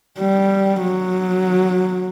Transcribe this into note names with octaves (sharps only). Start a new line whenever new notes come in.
G3
F#3